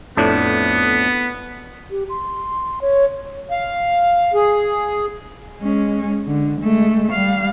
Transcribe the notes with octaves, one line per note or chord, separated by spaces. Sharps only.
F2 A2 B3 D4
G4
C6
C#5
F5
G#4
G#3 C#4
D3
G#3 A3
G3 F5